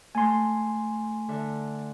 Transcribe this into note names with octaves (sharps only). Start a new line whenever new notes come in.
A3 G#5 C6
D3 E5